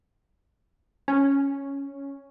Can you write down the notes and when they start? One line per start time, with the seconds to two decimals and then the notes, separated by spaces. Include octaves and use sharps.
1.08 C#4